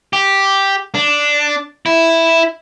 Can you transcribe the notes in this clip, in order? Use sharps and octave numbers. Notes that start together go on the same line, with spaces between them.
G4
D4
E4